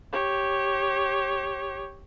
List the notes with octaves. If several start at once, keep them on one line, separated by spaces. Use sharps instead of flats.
G4 C#5